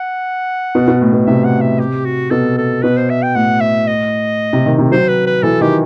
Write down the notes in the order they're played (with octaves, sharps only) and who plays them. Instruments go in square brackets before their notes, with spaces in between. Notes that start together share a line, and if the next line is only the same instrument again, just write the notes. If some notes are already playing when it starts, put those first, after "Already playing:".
Already playing: [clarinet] F#5
[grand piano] B2
B2
A2
B2
[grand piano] C3 [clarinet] E5
[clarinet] F#5
E5
G4
F#4
[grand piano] B2 [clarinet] A4
[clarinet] A4
[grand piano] B2 [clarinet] B4
[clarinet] C5
E5
G5
[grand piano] A2 [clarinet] F#5
[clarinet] E5
D#5
[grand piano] C3
D#3
C3
[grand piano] F#3 [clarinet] C5
[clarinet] B4
B4
[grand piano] E3 [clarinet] A4
[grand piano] D#3 [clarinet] G4